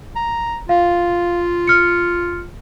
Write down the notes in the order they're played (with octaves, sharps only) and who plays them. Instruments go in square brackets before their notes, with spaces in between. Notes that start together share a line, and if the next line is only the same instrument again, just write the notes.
[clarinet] A#5
[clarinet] F4 [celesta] F5
[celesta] F6 C#7